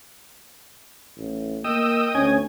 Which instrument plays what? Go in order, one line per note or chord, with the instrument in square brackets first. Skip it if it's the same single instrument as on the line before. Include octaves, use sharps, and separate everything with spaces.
[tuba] A1
[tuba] A#3 [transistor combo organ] D#5 G5 D#6 [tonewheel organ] E6
[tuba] D2 [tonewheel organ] C#4 G#5